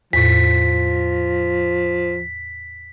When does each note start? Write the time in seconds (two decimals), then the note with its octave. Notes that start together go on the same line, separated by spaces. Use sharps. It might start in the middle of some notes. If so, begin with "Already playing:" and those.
0.13 E2 A2 F3 B6